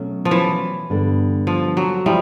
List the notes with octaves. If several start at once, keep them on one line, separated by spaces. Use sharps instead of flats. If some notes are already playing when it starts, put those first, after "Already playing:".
Already playing: B2 F#3 A3 C#4 F#4
F3
E3
G2 D3 G3 B3
F3
F#3
F3 G3 E4